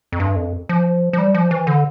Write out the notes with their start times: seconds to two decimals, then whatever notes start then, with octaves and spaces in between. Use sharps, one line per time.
0.12 F2
0.20 G2
0.36 F2
0.69 F3
1.13 F3
1.18 G3
1.34 F3
1.51 E3
1.67 D3